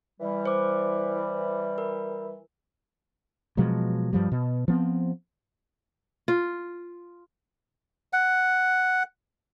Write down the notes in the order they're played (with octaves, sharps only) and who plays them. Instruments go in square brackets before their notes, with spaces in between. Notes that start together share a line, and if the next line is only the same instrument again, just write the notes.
[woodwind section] E3 G3
[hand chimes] C5 D6
A#4
[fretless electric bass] B2 F3 F#3 G#3
G2 F3 G3
B2
F3 B3 C4
[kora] F4
[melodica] F#5